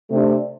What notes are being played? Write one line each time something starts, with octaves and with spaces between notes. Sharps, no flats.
C3 A3 D4